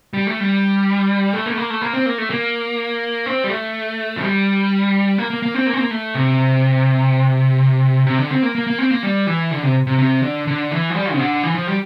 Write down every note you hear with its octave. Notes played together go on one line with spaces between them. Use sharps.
G3
A3
G3
A3
A#3
A3
A#3
A3
A#3
C4
A#3
A3
A#3
C4
G3
A3
F3
G3
A#3
A#3
A#3
C4
A#3
C4
A#3
A3
C3
C3
D3
C4
A#3
A#3
A#3
C4
A#3
G3
E3
D3
C3
C3
C3
D3
D3
E3
F3
G3
C3
D3
E3
F3
G3